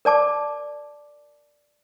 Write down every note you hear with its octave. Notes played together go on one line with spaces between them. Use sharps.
A#4 D5 A5 D6